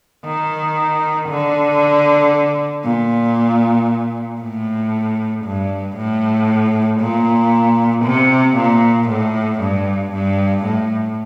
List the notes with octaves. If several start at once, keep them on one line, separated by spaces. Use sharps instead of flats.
D#3
D3
A#2
A2
G2
A2
A#2
C3
A#2
A2
G2
G2
A2